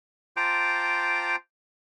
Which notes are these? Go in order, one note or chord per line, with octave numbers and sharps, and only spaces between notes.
F4 C5 G5 A5 A#5 D6